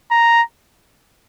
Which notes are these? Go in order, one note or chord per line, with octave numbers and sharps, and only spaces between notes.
A#5